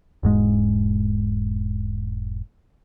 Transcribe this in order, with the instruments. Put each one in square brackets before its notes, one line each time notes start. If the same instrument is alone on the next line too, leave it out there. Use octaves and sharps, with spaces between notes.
[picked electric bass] E1 G#2 G#3